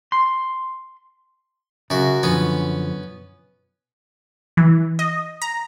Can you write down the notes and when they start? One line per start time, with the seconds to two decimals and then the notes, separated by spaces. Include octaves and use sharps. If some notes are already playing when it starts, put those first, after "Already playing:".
0.12 C6
1.90 F#2 C#3 F#4
2.23 F#2 D3 F3 B3 C#4
4.57 E3
4.99 D#5
5.42 A#5